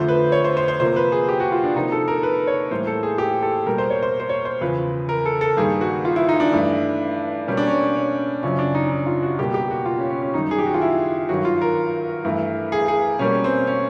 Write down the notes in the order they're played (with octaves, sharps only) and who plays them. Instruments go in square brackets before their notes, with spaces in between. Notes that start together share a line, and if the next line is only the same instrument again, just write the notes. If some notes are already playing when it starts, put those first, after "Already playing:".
Already playing: [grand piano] F2 D3 F3 A3 C5
B4
C#5
C5
C5
C5
C3 F3 A#3 C5
B4
G#4
G4
F#4
F4
D4
C3 F3 A#3 D#4
A4
A#4
B4
C#5
A2 E3 G3 A#3 C5
A4
G#4
G4
A4
B2 G3 A#3 A#4
C5
C#5
C5
C5
C#5
C5
E2 C#3 F3 B4
A#4
A4
A4
G2 D#3 G3 A#3 G#4
F#4
F4
E4
D#4
D4
G2 E3 A3
B2 G3 A#3 C#4
D4
C#4
C#4
F#2 C#3 F3 C#4
D4
D#4
D#4
F4
F#4
B2 G3 A#3 G4
G4
F#4
F4
C#4
C#4
C#4
F#2 D#3 G3 D#4
G#4
G4
F#4
F4
E4
G2 D#3 F#3 F#4
F4
A#4
G2 E3 A3
G#4
G#4
B2 G3 A#3 C#4
C4
C#4